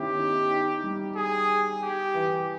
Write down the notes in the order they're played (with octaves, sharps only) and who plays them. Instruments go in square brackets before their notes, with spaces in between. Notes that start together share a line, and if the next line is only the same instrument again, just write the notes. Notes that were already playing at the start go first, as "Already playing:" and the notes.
Already playing: [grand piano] D#3 B3 C#4 E4 [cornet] G4
[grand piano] D#4
D#4
G3
[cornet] G#4
G4
[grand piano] E3